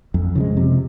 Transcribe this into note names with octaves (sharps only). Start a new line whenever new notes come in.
F2
C#3 F3 G#3
C3